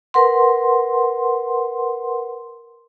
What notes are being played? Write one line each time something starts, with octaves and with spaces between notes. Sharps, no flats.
A#4 B4 F#5 C6